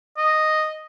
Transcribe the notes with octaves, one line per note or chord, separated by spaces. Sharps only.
D#5